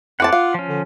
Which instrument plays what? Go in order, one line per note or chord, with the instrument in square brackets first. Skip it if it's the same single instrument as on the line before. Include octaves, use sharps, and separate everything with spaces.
[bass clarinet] F2 [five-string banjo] E3 C5 A5 [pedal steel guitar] F#5 D6
[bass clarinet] F4 [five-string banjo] F5
[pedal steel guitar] F3 C#4
[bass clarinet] D3